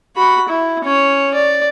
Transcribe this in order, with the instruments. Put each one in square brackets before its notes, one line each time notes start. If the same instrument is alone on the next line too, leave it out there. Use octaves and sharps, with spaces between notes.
[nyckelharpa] F#4 B5
E4
C#4 C#5
D5